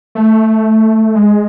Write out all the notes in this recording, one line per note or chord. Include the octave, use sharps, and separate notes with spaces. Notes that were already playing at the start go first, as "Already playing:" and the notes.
A3
G#3